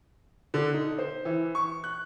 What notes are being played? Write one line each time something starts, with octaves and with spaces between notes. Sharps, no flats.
D3
D#4
C5
E3
C#6
F#6